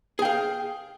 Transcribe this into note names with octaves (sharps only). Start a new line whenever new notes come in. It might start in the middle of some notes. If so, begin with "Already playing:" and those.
G#4 F5 G5